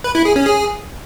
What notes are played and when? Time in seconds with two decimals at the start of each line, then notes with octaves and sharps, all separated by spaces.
0.04 B4
0.15 E4
0.25 G#4
0.36 C#4
0.46 G#4